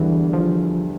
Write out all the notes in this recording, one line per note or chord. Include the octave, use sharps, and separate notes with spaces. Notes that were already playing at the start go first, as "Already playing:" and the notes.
Already playing: E2 D3 E3 G3
F3